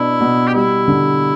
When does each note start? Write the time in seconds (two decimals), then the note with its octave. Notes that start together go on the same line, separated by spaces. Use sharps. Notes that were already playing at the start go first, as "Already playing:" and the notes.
Already playing: B2 B3 D4 E4
0.20 B2
0.48 G4
0.53 G3 E4
0.88 D3